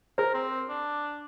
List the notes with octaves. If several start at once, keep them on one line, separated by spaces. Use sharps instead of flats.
G#4 A#4 C5
C4
D4